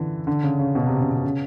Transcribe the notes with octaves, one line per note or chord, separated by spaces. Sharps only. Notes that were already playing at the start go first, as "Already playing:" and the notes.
Already playing: D3 E3
D3
C#3
C#3
B2
C3
C#3
C3
C#3